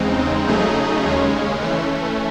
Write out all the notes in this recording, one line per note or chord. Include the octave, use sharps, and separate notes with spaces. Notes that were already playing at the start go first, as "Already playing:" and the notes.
Already playing: E2 C#3 G#3 C4 D#4
C#3 F#3 A3 D#4 G#4
D#2 C#3 G#3 C#4
E3 A3 C#4